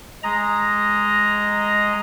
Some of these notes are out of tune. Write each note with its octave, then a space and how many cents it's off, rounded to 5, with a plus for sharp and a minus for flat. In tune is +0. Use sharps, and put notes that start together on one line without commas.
G#3 +0 D#5 +0 A#5 +0